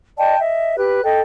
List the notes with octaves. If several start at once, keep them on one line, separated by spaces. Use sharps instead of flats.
D5 D#5 G5 A5
D#5 E5
G4 B4 F#6
A4 D#5 G5